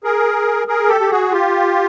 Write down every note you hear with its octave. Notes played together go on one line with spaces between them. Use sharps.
G#4 A#4
G#4 A#4
G4 A4
G4
F#4 G#4
F4 G4